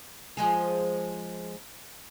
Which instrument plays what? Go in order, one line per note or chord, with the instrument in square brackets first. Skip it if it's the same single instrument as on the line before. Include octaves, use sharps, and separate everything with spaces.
[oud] F3 G#3 G#4